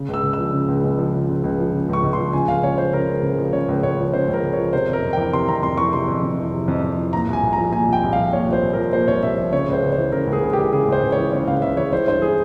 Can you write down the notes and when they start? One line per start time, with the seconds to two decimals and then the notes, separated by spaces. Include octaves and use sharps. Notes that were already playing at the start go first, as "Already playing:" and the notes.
Already playing: C#3
0.09 C#2
0.14 E6
0.23 C#2
0.33 F3 E6
0.53 C#3
0.68 C#2
0.84 C#2
0.99 F3
1.13 C#3
1.29 C#2
1.44 C#2
1.58 F3
1.73 C#3
1.89 C#2 C#6
2.03 C#2
2.13 F3 C6
2.33 C#3 G#5
2.48 C#2 F5
2.64 C#2 C#5
2.78 F3 C5
2.93 C#3 A#4
3.09 C#2
3.23 C#2
3.38 F3
3.53 C#3 C#5
3.69 C#2
3.83 C#2 C#5
3.99 F3
4.13 C#3 C5
4.28 C#2
4.33 A#4
4.43 C#2
4.53 F3 C#5
4.73 C3 C5
4.88 F2
4.93 A#4
5.03 F2
5.13 E3 G5
5.33 C3 C6
5.48 F2 A#5
5.63 F2 C6
5.77 E3 C#6
5.93 C3 C6
6.08 F2
6.23 F2
6.38 E3
6.54 C3
6.68 F2
6.83 F2
6.98 E3
7.13 A#2 A#5
7.29 C2 G#5
7.43 C2
7.53 A#5
7.58 F3
7.72 A#2 G#5
7.88 C2 G5
8.03 C2
8.13 F5
8.18 F3
8.33 A#2 C#5
8.48 C2 C5
8.62 C2
8.73 F3 A#4
8.93 A#2 C5
9.08 C2 C#5
9.23 C2 E5
9.38 F3 E5
9.52 C#3 C#5
9.68 C#2 C5
9.83 C#2
9.93 C5
9.98 E3
10.12 C#3 A#4
10.27 C#2
10.33 G#4
10.43 C#2
10.53 E3 G4
10.73 C#3 G#4
10.88 C#2 C5
11.03 C#2
11.12 C#5
11.18 E3
11.33 C#3 C#5
11.47 C#2 F5
11.62 C#2 E5
11.77 E3 C#5
11.92 E3 C5
12.07 G2 C5
12.22 E3 G#4